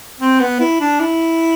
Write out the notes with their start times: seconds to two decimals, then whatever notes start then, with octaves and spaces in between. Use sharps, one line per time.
0.20 C4
0.40 B3
0.60 E4
0.80 D4
1.00 E4